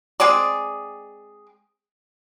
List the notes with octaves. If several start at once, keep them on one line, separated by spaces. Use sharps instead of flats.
G#3 C4 G#4 D5